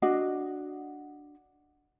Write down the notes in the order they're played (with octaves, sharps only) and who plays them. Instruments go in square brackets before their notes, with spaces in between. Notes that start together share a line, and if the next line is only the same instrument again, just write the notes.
[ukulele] D4 F#4 D#5